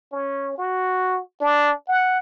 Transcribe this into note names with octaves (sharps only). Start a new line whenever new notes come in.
C#4
F#4
D4
F#5